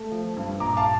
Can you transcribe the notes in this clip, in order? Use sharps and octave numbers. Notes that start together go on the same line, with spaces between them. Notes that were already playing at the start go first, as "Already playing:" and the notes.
Already playing: A3
F3
G2
A#2 A#5 D6
F5 A5